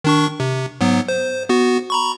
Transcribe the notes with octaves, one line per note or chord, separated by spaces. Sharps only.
D#3 D4 C#6
C3
G#2 F#3 B3
C5
B3 F#4
A#5 B5 C#6